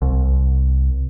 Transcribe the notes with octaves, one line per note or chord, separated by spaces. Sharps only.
C2